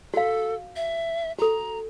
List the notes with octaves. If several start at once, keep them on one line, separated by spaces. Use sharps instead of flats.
F#4 A4 F5
E5
F#4 A4 A#5